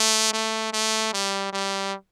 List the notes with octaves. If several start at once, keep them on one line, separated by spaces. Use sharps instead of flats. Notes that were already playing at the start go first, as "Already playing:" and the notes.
Already playing: A3
A3
A3
G3
G3